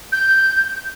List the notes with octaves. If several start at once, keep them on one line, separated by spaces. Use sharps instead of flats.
G6